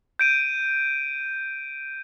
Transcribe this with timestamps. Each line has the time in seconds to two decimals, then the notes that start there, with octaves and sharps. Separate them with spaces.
0.19 G6 D7 D#7